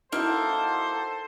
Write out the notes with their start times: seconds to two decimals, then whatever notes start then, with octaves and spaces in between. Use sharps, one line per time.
0.13 A#3 D#4 E4 F#4 A4 C5